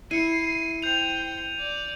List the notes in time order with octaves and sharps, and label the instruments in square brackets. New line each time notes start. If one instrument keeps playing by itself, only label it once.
[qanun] E4 [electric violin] C7 [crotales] C#7 D#7
[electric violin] C5 G5 [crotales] G6 F7
[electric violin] D5